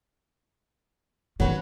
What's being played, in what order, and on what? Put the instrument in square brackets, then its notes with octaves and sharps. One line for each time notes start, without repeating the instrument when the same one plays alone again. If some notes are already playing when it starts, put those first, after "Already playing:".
[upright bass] D#3 [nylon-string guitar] F#3 C#4 B4